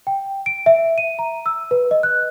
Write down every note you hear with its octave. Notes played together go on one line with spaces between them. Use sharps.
G5
D7
E5
D#7
A#5
E6
B4
D#5
F#6